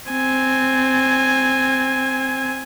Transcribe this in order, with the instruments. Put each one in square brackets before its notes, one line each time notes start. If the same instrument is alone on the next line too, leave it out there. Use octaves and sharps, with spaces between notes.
[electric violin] C4 G#5